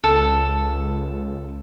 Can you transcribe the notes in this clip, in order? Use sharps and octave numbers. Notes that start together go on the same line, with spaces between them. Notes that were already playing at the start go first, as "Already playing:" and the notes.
C#2 A4